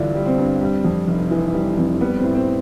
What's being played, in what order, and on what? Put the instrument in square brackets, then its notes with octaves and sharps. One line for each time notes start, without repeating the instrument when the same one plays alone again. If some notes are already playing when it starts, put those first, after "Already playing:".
Already playing: [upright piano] A1 G2 D3 G3 D4 E4 F4
G3
C4
G2
G3
F2
F1
E3
G3
F2
G3 B3
C4
A2
C4